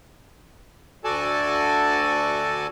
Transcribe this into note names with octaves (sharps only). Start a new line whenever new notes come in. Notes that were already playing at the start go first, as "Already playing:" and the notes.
D2 F#4 A4 D5 G#5 A5